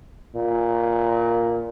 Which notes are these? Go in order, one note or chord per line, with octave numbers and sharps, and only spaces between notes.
A#2